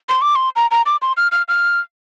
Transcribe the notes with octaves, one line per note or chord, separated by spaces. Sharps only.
C6
D6
C6
A#5
A#5
D6
C6
F6
F6
F6